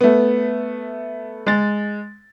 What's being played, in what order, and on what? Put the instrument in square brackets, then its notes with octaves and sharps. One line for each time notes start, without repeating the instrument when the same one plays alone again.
[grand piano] A3 B3
G#3 A6